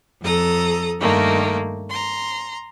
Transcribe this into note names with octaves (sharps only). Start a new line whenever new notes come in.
F2 A4 A#5 D#6
G2 D#3 A3 A#3
A#5 C6